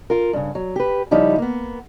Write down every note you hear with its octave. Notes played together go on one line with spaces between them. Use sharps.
F4 A#4
G2 C#3
F#3
G4 B4
C#3 F3 G3 D#4 E4 C#5
A#3 B3